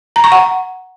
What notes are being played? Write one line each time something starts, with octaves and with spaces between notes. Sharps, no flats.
A#5
C#6
F#5